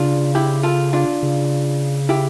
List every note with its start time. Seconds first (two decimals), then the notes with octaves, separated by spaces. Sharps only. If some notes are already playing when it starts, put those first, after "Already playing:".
Already playing: C#3 D4 F4
0.35 E4 G4
0.63 F4 A4
0.93 D4 F4
1.23 C#3
2.09 E4 G4